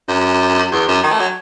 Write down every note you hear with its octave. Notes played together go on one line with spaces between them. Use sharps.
F#2
E2
F#2
D#3
A3
F#3